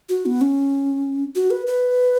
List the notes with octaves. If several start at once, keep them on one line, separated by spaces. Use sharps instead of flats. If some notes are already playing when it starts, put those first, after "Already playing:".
F#4
B3
C#4
F#4
B4
B4